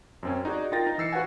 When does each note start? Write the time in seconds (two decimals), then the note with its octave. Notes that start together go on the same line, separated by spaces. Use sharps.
0.23 F#2 C4 C#4
0.45 D#4 F#4 G#4 D5
0.72 D#4 F4 A#4 G5 A6 A#6
0.87 D#4
0.98 E3 E6 C7 C#7
1.12 F#4 B4 F5 F#5 G#5